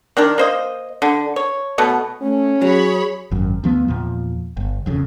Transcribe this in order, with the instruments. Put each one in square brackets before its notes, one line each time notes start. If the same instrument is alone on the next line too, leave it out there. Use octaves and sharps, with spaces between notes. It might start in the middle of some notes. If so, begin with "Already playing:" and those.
[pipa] D#3 D4 A#4
A#3 C5 D#5
D3
C#5
B2 A3 B3
[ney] A3 [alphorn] C#4
[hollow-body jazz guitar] F#3 [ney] G#4 [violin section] C#5 B5
[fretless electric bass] G#1 F#2
D2 F3 B3
E2 A#2 F3
G1
E1 F2 C#3